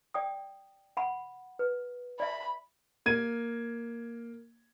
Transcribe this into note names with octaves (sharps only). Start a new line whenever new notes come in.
D5 G5 D#6
F#5 B5
B4
D5 E5 B5
A#3 G#6 D#7